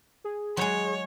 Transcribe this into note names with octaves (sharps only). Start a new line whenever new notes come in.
G#4
F#3 G#3 C#5